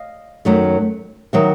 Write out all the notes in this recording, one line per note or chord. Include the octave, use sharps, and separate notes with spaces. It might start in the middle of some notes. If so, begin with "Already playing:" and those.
Already playing: D#5 F5
F#2 D#3 F#3 A3
D#3 F#3 E5